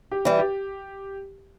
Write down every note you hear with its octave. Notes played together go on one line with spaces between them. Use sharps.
G4
E3 G3
G4